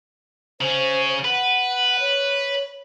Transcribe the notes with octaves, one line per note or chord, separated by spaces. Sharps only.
C#3 C#4 C5
B4 F#5
C#5